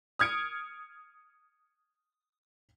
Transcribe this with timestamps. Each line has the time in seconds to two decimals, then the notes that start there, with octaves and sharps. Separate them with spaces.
0.19 D#6 F6 G#6 C#7 D7